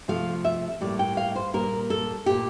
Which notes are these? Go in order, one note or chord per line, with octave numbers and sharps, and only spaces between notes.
C3 F3 A3 F5
E5
A2 G3 A#3 D5
G5
F5
C5
A#2 G3 A#3 A#4
A4
A#2 A3 G4